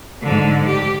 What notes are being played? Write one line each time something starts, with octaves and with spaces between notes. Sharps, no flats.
G#2 D3
G4